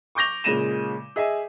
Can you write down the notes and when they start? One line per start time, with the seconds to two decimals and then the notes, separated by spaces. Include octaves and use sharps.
0.15 C#6 D6 G6 A#6 F7
0.44 A#2 C#3 G#3 A#6 D#7 E7
1.16 G#4 D#5 E5 G#5